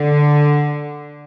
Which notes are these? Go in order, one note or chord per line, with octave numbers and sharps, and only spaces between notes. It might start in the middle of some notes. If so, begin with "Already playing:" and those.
Already playing: D3